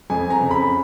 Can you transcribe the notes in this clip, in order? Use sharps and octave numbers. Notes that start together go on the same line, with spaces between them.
F2 G#5
A#5
C#3
B5